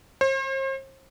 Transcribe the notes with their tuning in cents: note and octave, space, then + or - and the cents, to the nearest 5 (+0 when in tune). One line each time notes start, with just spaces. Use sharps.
C5 +40